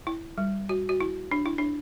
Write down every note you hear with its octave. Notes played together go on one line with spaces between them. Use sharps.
E4
G3
F#4
F#4
E4
D4
E4
D4